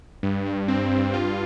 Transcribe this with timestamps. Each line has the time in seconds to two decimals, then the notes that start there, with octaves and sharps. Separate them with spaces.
0.23 G2
0.46 G2
0.68 C4
0.91 G2
1.13 F4